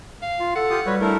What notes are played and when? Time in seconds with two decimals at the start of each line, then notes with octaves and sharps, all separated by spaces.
0.22 F5
0.39 F4
0.56 A4 F#5
0.70 F4 G4 D#6
0.86 G3 F#4 B4 C#5
1.00 A3 D4 E4 A#4